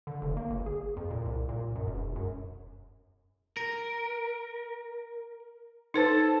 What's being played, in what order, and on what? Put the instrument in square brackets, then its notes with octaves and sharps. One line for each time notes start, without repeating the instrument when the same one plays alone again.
[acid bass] D3
F1
A#3
G1
G#4
F2
A#2
C2
A#2
F#2
E1
F#2
[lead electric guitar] A#4
[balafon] D#4 B4 C5 [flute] A4